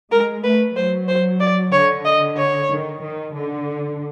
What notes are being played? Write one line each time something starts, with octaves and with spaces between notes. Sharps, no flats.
G#3 A#4
A3 B4
F#3 C5
C5
D5
D3 C#5
D#5
C#5
D#3
D#3
D3